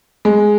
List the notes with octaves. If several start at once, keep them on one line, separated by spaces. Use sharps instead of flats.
G#3